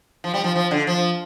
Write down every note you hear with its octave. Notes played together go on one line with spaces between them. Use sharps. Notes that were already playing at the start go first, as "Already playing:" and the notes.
F3
G3
F3
F3
D3
F3